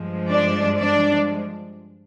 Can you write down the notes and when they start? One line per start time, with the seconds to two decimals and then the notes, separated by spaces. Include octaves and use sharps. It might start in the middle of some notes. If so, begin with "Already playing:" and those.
Already playing: G2 F3 G#3
0.31 D4 D5
0.79 D4 D5